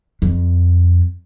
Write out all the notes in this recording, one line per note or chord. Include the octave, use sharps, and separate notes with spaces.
F2